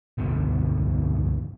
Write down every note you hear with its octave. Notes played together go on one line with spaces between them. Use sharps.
C#2 G2 B2 D3